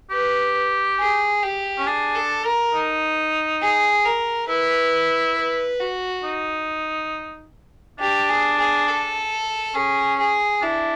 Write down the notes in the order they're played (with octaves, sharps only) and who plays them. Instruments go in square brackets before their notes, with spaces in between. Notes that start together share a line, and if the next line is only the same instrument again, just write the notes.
[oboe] G4 [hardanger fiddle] B4
[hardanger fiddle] G#4
G4
[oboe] C#4
[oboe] D4 [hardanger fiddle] G#4
[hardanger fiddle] A4
A#4
[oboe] D#4
[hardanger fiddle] G#4
A#4
[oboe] E4 [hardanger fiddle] B4
[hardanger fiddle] B4
F#4
[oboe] D#4
[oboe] D4 [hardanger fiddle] G4
[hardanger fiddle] G#4
G#4
A4
[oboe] C#4 [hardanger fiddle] G#4
[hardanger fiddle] G#4
[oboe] D4 [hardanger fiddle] E4